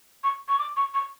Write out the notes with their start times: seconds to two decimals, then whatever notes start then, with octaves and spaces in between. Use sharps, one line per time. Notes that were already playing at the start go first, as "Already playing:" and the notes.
0.24 C#6
0.48 C#6
0.59 D6
0.77 C#6
0.94 C#6